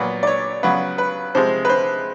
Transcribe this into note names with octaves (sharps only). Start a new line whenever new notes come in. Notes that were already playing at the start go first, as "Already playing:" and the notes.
Already playing: A#2 F#3 B3
D5
C#5
C#3 F#3 B3 B4
B4
C3 F3 G#3 C5
B4
C5